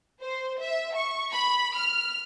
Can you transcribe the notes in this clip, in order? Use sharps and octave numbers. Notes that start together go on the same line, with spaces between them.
C5
E5
C#6
B5
F6